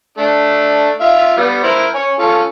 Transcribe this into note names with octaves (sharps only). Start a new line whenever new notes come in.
A3 D4
F4 E5 F5
G3 B3
E4 A#4 C5
C#5 G#5
C#4 F4 A4